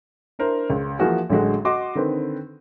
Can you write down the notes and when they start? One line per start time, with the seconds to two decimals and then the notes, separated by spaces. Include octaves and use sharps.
0.39 D4 E4 A#4 C5
0.70 C#2
0.99 E3 F3 A#3 F#4 G#4
1.30 A1 D3 F#3 G#3 F#4
1.65 F#4 D#5 C6 D6
1.95 D3 D#3 C4 B4